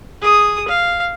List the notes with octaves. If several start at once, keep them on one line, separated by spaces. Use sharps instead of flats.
G#4 D#6
F5